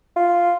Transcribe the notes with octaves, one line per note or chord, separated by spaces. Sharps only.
F4